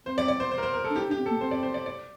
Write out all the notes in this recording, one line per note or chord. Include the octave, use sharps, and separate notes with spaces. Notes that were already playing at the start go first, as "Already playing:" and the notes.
C4 C5
D5
D5
C5
C5
A#4
C5
A#4
A4
D4
D#4 G4
D4
G4
C4
A4
A#3
C4 C5
D5
C5
D5
D5